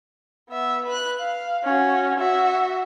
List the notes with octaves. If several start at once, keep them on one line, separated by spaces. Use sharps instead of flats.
B3 E5
B4 F#6
F5
C#4 F#4
F#4 E5